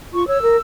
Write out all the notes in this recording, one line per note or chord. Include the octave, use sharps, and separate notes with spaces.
F4 C#6
C#5 E6
A#4